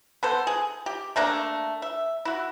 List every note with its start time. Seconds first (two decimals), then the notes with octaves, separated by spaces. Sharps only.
0.23 B3 A4 C5
0.47 G#4
0.86 G4
1.16 A3 A#3 D4
1.82 E5
2.25 E4 F#4